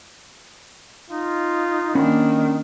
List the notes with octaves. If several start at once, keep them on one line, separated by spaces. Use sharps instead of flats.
D#4 F4
D#3 A#3 C#4 D4 F#5 B5